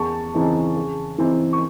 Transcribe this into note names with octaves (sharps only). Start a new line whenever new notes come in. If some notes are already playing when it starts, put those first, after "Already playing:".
Already playing: E2 A5 C#6
C#3 E3 C4 D#4
C#3
E3 C4 D#4
C#6